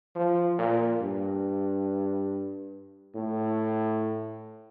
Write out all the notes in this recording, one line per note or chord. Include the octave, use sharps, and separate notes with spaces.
F3
A#2
G2
A2